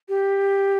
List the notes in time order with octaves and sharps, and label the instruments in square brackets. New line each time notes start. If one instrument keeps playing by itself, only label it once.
[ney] G4